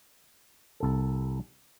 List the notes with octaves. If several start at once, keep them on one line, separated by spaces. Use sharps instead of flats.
C2 A4